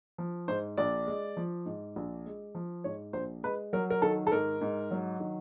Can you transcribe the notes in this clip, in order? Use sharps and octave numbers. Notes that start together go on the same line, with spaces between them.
F3
G#2 C5
A#1 D5
G#3
F3
G#2
A#1
G#3
F3
G#2 C#5
A#1 C5
G#3 B4
F#3 A#4
A#4
D#3 A4
A4
G#2 A#4
G#2
F#3
D#3